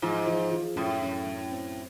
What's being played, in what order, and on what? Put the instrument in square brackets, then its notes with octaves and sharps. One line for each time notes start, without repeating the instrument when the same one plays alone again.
[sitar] G#2 [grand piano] F3
[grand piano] F3
F3
[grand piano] F#2 [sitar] A2
[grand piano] F#2
F#2
C4